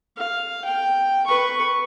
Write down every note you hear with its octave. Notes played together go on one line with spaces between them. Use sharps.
F5
G5
B4 C#6